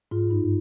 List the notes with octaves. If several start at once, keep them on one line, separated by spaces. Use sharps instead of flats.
G#2 F4
G2 D#4